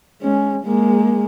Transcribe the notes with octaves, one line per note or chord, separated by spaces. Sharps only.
G#3 C#4
G#3 A#3